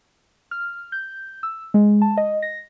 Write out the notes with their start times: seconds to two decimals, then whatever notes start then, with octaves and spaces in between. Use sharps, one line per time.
0.51 F6
0.92 G6
1.43 E6
1.74 G#3
2.02 A5
2.17 D#5
2.42 A#6